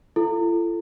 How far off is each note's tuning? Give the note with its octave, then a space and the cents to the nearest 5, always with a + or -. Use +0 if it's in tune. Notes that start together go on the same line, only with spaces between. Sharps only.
F4 -45 A4 +0